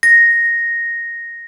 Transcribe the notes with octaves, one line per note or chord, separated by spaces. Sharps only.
A#6